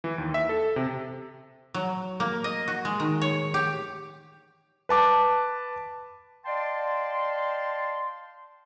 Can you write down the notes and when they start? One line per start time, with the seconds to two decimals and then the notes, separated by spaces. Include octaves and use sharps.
0.04 E3
0.18 D#2
0.34 E5
0.49 A4
0.76 C3
1.74 F#3
2.20 A#3
2.44 D#5
2.68 F#4
2.85 G#3
3.00 D#3
3.22 C#5
3.54 G4
4.89 B4 A5 D6
6.46 D5 D#5 F5 G5 A5 C6